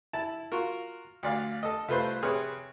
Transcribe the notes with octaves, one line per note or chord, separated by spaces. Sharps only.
E4 A5
F4 F#4 A#4
D2 D5 F5
A4 D#5
C2 A3 F4 B4 C5 C6
C3 G#4 B4 C#5 F6